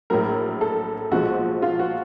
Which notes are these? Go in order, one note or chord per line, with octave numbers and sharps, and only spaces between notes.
A#1 A2 F#3 A#4
A4
B1 A#2 F3 G#3 F#4
F4
F#4